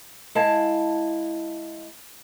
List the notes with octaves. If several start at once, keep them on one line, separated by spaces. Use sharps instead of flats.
G#3 E4 F5 A5